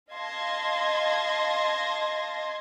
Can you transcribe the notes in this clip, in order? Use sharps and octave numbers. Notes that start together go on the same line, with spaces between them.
D#5 F5 A5 C6 G#6 A#6